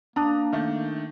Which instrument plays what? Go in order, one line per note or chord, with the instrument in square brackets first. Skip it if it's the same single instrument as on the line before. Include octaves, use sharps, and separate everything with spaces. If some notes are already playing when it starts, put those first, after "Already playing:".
[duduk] A#3 [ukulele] D4 [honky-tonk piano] A#5 D#6
[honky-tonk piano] D#3 A3